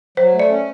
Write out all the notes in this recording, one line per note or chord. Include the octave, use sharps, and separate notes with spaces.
F#3 C5
A3
D5
C#4